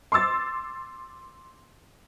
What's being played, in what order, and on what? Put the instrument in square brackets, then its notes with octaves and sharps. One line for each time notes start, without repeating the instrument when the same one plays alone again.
[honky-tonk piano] C6 D6 E6 A6